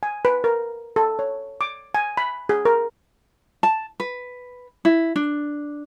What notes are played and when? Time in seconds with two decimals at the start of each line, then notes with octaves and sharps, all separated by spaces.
0.03 G#5
0.25 B4
0.44 A#4
0.96 A4
1.19 C#5
1.61 D6
1.95 G#5
2.17 B5
2.49 G#4
2.65 A#4
3.63 A5
4.00 B4
4.85 E4
5.16 D4